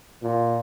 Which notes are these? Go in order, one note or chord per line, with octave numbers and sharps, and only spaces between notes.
A#2